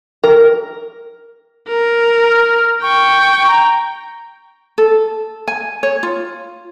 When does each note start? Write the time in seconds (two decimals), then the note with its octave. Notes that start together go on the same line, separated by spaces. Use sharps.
0.24 A#4
1.68 A#4
2.31 F6
2.82 G5 C#6
3.48 A#5
4.78 A4
5.48 G#5
5.83 C#5
6.03 F4